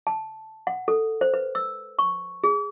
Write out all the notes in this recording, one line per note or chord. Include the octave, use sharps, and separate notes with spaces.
A5
F#5
A4
C5
B4
E6
C#6
G#4